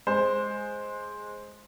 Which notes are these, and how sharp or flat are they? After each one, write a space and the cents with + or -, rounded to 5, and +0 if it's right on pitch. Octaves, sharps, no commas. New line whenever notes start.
G#3 +0 C5 +5